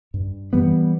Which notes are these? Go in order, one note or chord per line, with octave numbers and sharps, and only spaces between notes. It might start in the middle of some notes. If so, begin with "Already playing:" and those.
G2
E3 G3 B3